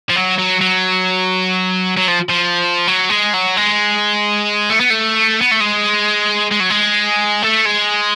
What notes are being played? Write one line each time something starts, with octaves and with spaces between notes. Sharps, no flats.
F3
F#3
F#3
F#3
F#3
F3
F3
F#3
G#3
F#3
G#3
A3
B3
A3
B3
A3
G#3
G#3
F#3
G#3
A3
G#3